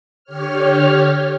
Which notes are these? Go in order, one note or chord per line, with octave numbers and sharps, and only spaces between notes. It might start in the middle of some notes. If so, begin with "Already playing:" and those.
D3 G4 C#5 F6